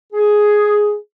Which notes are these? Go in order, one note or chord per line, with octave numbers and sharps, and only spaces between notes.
G#4